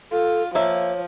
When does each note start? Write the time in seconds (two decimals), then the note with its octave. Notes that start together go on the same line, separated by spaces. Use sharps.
0.12 F4 A4
0.55 F3 A#3 C#5 E5